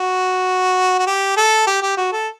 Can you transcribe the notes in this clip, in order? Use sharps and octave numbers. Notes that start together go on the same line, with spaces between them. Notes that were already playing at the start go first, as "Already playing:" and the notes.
Already playing: F#4
F#4
G4
A4
G4
G4
F#4
A4